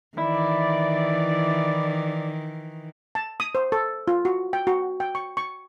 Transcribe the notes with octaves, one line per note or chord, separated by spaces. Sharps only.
D#3 E3 E4 D5
A5
D#6
C5
A4
F4
F#4
G5
F#4
G5
C#6
C#6